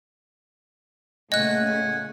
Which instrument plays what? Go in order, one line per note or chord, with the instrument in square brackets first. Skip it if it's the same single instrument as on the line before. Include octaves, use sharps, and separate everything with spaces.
[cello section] A#2 C#3 A3 [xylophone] D#5 F#6 [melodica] F#5 G#5